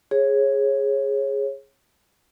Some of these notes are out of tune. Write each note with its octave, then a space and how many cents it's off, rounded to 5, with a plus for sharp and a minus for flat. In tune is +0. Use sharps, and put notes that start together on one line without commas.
G#4 +0 C#5 -25